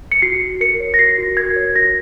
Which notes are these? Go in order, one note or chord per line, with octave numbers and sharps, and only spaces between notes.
C#7
F#4 C7
F#4
A#4 C#7
C#5
A#6
F#4 C7
F#4
A#4 G#6
C#5
F#4 A#6